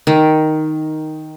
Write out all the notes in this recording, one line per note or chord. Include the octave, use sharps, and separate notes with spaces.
D#3